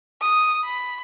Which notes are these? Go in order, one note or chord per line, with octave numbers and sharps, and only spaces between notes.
D#6
B5